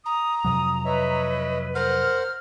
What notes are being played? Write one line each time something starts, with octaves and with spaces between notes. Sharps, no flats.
A#5 D#6
F2 C3 F#3 D#6
B4 C#5 D#5 E5
A#4 C5 F#5 F6